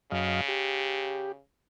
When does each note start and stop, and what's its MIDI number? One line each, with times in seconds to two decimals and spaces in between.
0.12 0.41 42
0.12 1.39 49
0.12 0.41 75
0.12 0.41 77
0.48 1.32 67